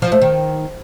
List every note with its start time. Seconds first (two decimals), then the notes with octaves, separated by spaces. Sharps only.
0.02 F3
0.12 A3
0.22 D#3